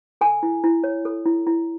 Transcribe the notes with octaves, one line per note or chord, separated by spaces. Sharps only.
A4 G#5
E4
E4
C#5
A4
E4
E4